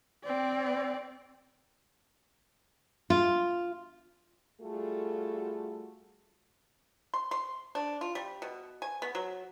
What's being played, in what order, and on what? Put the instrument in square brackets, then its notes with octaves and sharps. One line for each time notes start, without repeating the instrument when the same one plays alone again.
[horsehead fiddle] C4 D5
[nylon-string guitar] F4
[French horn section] G3 A3 F4 F#4 G#4 A4
[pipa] C6
C6
D4
F4
G3
B2
G#5
B3
F#3